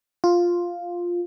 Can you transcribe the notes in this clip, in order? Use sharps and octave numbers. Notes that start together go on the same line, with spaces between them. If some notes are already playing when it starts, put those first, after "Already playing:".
F4